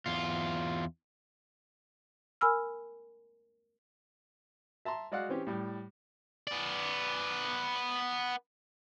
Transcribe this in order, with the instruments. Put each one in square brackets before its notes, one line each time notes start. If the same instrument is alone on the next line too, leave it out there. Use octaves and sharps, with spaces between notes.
[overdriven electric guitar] E2 F4
[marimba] A#4 G#5 B5 E6 F6
[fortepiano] E5 A5 A#5 C6
G#3 F#4 D5 F5 F#5
E3 C4 C#4 G4
A2 G3
[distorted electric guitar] B3 D5